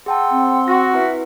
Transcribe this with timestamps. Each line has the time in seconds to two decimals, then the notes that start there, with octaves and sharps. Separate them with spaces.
0.06 G#4 F#5 G5 A5 C6 E6
0.31 C4
0.68 F#4 A#6
0.94 E4 B4 E5